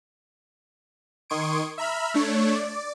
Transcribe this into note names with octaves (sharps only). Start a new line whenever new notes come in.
D#3 C6 C#6 D#6 G#6 D7
E5 A#5 B5 F6
A3 D4 C#5
D5